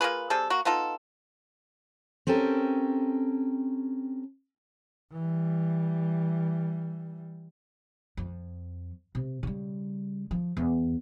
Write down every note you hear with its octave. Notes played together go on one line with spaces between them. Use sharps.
A#3 F4 G#4 B4
C3 G3 G#4 A4
A#3 F#4
B3 D#4 F4 A4
C4 C#4 G4 A4 A#4
E3 G3
F2
C3
C#3 G3
F3
E2